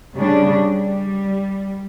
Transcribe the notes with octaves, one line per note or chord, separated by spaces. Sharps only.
C#3 G3 D4
G3